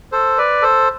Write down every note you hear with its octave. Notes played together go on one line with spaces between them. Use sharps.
A4 C5
B4 D5
A4 C5